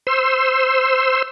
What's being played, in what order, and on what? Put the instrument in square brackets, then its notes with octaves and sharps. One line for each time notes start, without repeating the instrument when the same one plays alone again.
[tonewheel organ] C5 C6 E6